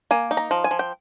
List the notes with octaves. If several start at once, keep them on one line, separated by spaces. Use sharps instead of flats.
A#3 G#5
D#4
A#5
F3
G#5
F3
G5